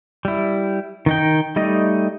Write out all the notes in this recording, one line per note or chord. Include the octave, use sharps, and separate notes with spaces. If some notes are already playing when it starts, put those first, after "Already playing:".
G3 E4
D#3 D#4 G5
G3 A3 D#4 D#5